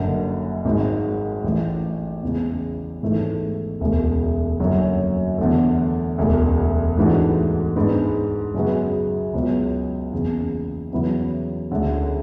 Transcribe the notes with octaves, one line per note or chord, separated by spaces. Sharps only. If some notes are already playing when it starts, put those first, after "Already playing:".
Already playing: F#1 F#2 D3
G#1 G#2 G#3
A1 A2 E3
E2 C#3 G#3
G#1 G#2 E3 A3
E1 D2 C#3 G#3
F#1 F#2 D3 F#3
E2 D3 A3
E1 D2 C#3
G#2 E3 A3 D4 F#4
G#2 G#3 B3 D4
F#2 C#3 G#3 B3 F#4
C#2 B2 F#3 B3
F#1 E2 C#3
E2 C#3 F#3 B3 E4
D2 D3 G#3 C#4